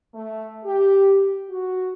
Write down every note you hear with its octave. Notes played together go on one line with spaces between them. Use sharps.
A3
G4
F#4